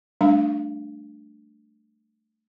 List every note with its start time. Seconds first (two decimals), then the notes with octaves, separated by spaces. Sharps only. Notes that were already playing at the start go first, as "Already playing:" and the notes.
0.21 G3 A3 D4 A#5